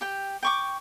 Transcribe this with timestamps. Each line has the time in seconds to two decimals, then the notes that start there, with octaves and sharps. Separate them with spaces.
0.01 G4 G5
0.43 G5 C#6 D6